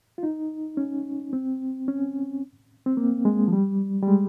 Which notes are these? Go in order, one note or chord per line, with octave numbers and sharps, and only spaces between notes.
F4
D#4
C#4
C4
C#4
C4
A#3
G#3
F3
G3
G3
G#3